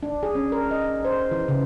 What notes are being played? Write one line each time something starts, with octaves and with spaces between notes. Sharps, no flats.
D4
G#4
C#4
A#4
D#5
C5
E3
C#3